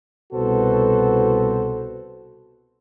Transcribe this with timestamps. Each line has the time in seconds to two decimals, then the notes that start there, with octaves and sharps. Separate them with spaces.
0.33 C2 B2 F#4 A4 B4 C5